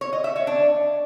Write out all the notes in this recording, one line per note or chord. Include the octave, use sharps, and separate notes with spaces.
C#5
D#5
E5
C#5
D4